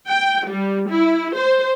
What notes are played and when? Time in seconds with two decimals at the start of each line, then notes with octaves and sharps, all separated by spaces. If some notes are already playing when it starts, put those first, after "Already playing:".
0.10 G5
0.49 G3
0.90 E4
1.36 C5